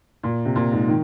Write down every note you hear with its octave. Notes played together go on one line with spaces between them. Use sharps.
A#2
C3
A#2
G#2
D#3